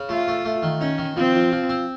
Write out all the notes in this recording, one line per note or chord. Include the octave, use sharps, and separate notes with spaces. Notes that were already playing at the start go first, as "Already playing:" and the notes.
Already playing: C#3
A3 F4
A3
A3
D#3
C#4 D#4
D#3
F3 C4
F3
F3
C4